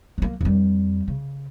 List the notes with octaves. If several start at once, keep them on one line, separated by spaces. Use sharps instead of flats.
F#3 A#3
F2 G3
C#3